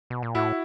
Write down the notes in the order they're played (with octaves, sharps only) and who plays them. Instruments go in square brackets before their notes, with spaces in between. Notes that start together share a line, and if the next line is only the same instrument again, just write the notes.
[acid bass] B2
A#2
[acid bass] A2 [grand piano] E4 F#4